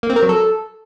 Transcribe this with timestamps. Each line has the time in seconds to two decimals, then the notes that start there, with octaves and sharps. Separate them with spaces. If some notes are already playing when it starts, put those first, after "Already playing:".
0.03 A#3
0.10 C4
0.16 A#4
0.23 F#3
0.29 A4